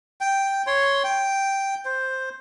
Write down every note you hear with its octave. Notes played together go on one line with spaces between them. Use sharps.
G5
C#5 C6
G5
C5